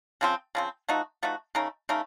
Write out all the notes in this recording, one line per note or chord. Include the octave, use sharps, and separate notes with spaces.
C#3 F3 C4
C#3 F3 C4
F3 A3 D#4 F#4
F3 A3 D#4 F#4
C#3 A3 D#4 A#4
C#3 A3 D#4 A#4